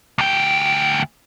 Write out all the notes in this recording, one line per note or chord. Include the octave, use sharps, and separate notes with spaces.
D2 G5